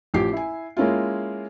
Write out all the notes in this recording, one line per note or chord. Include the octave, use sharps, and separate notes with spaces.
A1 F3 G4 D6 C7
E4 G#5
G#3 A#3 C#4 E4 F4